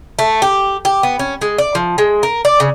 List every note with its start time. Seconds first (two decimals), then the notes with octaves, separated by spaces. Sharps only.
0.19 A3
0.42 G4
0.85 G4
1.03 B3
1.19 C#4
1.41 G#3
1.58 D5
1.75 F3
1.98 G#3
2.23 A#4
2.45 D5
2.60 C#3